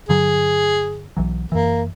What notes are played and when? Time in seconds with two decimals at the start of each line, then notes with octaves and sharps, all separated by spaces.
0.09 G2 D3 F#3 G#4
1.17 B1 E3 F#3
1.52 F#2 E3 A#3